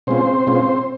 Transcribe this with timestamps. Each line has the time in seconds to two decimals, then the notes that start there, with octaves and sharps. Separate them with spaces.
0.07 B2 G#3 C4 C#4 F4 C5
0.47 B2 G#3 C#4 F4